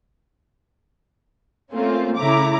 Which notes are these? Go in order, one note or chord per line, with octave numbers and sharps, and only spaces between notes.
A3 A#3 C4 C#4 F4
C#3 A3 E4 A#5 D6